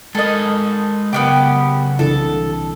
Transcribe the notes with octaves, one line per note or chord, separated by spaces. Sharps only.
G#3 A4 A#4 D#5
C#3 B3 D4 G4 A#4
C2 D3 E3 A4